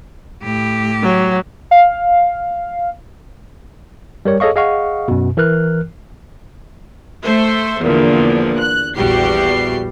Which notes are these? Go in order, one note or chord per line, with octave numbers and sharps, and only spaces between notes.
A2 G4
F#3
F5
G3 A#4 C#5
G#4 A4 C#5 D#5 F5 C#6
G#4 D#5 F5 F#5 C#6
F#2 B2
E3 A#4 F6 F#6
A3 A4 C5 E5
E2 A#2 D3 F3
F#6
A#1 E2 G3 F#4 G4 C7